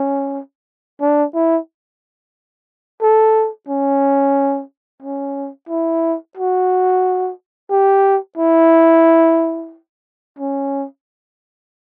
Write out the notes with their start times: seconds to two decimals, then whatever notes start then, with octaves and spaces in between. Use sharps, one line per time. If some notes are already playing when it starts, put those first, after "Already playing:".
Already playing: C#4
1.01 D4
1.35 E4
3.02 A4
3.69 C#4
5.03 C#4
5.69 E4
6.37 F#4
7.71 G4
8.38 E4
10.39 C#4